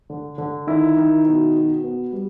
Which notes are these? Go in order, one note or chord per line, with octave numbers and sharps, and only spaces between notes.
D3
D3
D#3 E4
D#3
B2
B2
B3
G3